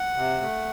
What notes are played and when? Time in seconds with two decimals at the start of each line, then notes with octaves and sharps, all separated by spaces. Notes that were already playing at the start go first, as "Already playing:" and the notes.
Already playing: F#5
0.16 C3
0.41 A3